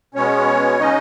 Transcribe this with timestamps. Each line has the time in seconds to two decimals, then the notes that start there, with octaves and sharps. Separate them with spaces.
0.15 B2 G#3 B3 C#4 C#5
0.79 C#3 G#3 C#4 D#4 D#5